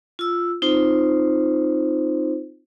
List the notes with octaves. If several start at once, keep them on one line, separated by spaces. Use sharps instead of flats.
F4 E6
C4 D#4 F4 C5